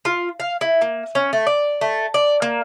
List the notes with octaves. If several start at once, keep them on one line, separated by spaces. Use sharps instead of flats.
F4
F5
E4
A#3
C#4
A3
D5
A3
D5
A#3